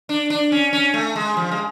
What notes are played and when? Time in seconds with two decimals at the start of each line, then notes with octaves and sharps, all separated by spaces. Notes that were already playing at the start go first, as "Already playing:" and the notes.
0.09 D4
0.30 D4
0.52 C#4
0.73 C#4
0.94 A3
1.15 G#3
1.37 F3
1.52 G#3